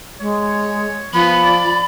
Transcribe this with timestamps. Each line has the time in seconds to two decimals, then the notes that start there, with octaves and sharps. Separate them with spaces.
0.20 G#3 C#5
1.13 F3 B3 B5
1.44 D5